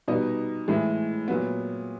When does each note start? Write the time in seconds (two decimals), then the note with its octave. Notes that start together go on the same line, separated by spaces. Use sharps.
0.08 B2 G3 B3 D#4 D#5
0.68 A2 E3 G#3
1.28 A#2 F#3 B3